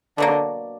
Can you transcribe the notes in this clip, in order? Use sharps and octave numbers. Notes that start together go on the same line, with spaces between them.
B2 D3 F#3 A#3